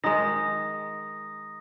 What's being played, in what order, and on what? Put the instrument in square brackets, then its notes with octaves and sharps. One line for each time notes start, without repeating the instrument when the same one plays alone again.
[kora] D#3 G#3 [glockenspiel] A#5 D#6 A#6